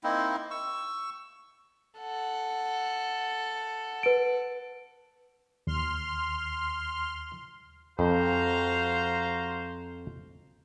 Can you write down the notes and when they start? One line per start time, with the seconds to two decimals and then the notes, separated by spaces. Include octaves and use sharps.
0.04 A#3 C4 D#4 E4
0.51 C#6 E6
1.99 A4 F#5
4.03 B4 D7
5.67 D#2 C6 F6
7.99 F2 F#4 C5 F5 A#5